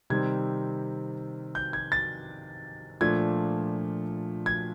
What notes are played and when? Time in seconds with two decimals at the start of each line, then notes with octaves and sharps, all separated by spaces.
0.10 C3 D#3 G3 C4 G#6
1.55 G6
1.73 G#6
1.92 A6
3.01 A#2 F3 A3 D4 G#6
4.46 G#6